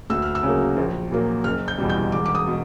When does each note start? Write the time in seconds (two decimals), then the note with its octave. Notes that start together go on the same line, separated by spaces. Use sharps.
0.10 D2 E6
0.22 F6
0.35 E6
0.43 C#3 F#3 A#3
0.77 A#1
1.11 A#2 F#3 A#3
1.44 F#1 F6
1.68 G6
1.78 E2 B2 G3
1.89 G6
2.12 E1 D6
2.25 D6
2.35 D#6
2.47 B2